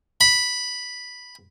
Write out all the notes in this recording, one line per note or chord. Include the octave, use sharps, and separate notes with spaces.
B5